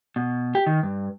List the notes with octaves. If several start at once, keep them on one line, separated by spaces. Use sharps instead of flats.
B2
G4
D#3
G2